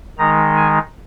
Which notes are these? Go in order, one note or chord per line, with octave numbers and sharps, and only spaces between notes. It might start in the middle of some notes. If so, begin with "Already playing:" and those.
D#3 G#3 D#4 A#5
G#5